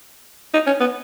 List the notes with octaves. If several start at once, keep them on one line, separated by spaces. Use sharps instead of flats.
D#4
C#4
B3